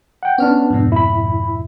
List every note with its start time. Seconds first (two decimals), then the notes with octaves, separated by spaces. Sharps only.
0.23 F#5 G5
0.38 B3 C#4 D4 F6
0.70 F2 G#2 B2
0.92 E4 B5